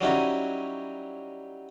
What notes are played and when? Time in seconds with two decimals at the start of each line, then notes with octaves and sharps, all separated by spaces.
0.01 F#3 G3 C#4 D#4 E4 F#4